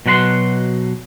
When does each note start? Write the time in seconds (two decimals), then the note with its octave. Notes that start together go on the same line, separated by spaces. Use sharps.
0.06 B2 F#3 F#5 B5 C6